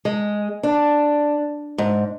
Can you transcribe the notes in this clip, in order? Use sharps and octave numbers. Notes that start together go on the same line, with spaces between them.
G#3
D4
G#2